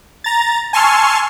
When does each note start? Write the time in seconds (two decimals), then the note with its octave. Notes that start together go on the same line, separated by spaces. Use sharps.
0.24 A#5 A6
0.73 G#5 A5 C6 C#6 E6 F6